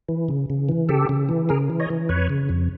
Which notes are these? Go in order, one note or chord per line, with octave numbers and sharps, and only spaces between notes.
E3
C#3
C#3
E3
C#3 G4 A4
C#3
E3
C#3 G#4 A#4
E3
C#5 D#5
E3
F2 B4 C#5
C#3
F2